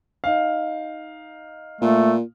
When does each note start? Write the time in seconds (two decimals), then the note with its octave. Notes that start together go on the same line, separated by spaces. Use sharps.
0.24 D#4 F5
1.81 A#2 A3